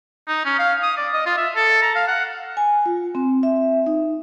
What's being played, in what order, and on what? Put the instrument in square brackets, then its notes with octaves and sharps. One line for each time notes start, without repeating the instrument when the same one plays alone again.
[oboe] D#4
C#4
F5
D#6
D5
D#5
F4
E5
A4
A#5
F5
F#5
[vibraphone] G#5
F4
C4
E5
D#4